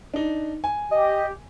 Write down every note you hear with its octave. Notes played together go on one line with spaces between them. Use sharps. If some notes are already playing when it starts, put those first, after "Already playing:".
D4 D#4
G#5
G4 D#5